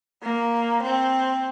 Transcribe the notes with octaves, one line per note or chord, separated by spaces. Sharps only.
A#3
C4